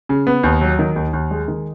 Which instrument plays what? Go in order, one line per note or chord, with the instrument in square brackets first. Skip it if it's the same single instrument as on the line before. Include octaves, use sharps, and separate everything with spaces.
[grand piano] C#3
B3
D#2
F#3
D#3
D#2
D#2
G#3
D#3